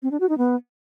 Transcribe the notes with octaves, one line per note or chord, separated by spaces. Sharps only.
C4
D4
F#4
D#4
B3